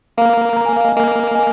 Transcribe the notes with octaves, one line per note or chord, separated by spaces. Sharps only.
A#3 F5 A#5
A#5
G#5
F5
D#5 G#5
A#3 D#5 G#5
D#5 G#5